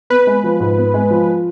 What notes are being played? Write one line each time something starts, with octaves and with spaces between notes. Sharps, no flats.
B3 B4
G#3
F3
G#2
B3
G#3
F3